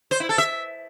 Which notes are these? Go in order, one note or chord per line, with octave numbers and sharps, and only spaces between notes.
C5
E4
A4
E5